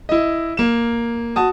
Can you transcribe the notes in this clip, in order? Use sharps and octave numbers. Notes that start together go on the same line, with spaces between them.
E4 D#5
A#3 E7
F#4 A5 D#6